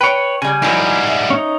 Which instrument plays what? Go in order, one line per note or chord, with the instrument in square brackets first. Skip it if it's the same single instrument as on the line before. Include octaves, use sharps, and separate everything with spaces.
[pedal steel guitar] B4 C#5 [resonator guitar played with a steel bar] G5
[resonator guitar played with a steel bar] C#3 G3 [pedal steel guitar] G#5
[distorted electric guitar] G#2 G3 [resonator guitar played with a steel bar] E3 F#3 A#4
[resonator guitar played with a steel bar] E5
[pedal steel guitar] C#4 D#4